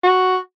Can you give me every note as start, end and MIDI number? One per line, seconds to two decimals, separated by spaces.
0.04 0.37 66